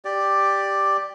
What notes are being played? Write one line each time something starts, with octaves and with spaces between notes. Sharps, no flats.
G4 D5